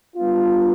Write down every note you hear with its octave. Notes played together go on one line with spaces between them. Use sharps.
G3 B3 D4 F4